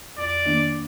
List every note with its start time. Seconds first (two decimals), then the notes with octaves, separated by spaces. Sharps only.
0.18 F2 D5
0.46 D#3 A#3 D4